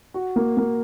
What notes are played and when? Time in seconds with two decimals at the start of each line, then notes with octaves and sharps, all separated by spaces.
0.14 F#4
0.36 A#3
0.57 A#3